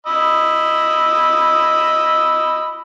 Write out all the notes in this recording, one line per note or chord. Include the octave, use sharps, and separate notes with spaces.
D#5 B5 E6